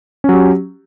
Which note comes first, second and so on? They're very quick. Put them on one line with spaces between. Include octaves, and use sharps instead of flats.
C#4 F#3 G4